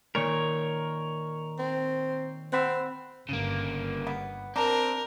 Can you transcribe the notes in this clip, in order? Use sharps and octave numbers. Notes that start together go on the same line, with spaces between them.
A#2 D#3 A#4 C#5 C#6
C4
C4 F#5 B5 E6
G1 C#3 A#3
B3
C4 D4 A#4 A#5